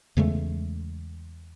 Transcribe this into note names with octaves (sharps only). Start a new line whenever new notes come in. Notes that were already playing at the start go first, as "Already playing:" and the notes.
E2 C#3 G#3 A3